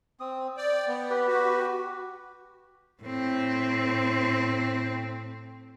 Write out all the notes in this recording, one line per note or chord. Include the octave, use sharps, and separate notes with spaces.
C4 D#6
D5 G5
B3
G4 B4
F#4
A2 C4